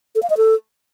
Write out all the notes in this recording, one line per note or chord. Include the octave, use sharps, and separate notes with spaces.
A4
F5
D#5
A4